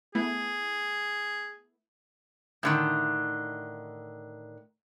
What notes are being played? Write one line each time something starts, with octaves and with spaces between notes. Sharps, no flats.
A3 B3 E4 G#4
A2 D3 D#3